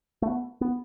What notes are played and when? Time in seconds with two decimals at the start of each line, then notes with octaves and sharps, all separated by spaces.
0.22 A3
0.27 B3
0.61 B3